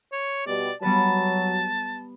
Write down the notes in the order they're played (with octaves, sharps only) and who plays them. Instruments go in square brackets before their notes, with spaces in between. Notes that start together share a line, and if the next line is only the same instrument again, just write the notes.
[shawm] C#5
[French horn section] B2 G3 [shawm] D5
[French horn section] F#3 [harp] G3 B3 B4 [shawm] A5